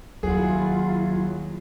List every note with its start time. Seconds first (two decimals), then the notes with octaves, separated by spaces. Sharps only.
0.23 D#2 F#3 E4 F4 G#4 F#5